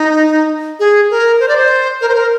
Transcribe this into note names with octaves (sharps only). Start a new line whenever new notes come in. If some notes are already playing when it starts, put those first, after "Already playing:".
Already playing: D#4
G#4
A#4
C5
D5
C5
A#4
C5
A#4